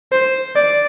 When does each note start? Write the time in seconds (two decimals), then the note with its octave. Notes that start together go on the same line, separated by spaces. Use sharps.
0.12 C5
0.56 D5